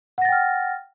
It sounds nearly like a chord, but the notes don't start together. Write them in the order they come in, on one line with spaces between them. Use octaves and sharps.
F#5 A#6 A6 G5 F6